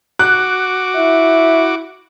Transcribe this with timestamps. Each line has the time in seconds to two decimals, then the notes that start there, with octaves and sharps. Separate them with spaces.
0.19 F#4 D6 F#6
0.96 E4 E5